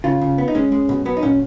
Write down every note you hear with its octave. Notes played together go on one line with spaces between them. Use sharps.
C#3 F4
C#3
B3
D#4
G#3 C#4
G#3
B2
F#3 B3
D#4
A#2 C#4